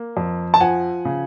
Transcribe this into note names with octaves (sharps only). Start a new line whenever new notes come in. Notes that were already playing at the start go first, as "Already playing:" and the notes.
Already playing: A#3
F2
A5
F3 F#5 G#5
C#3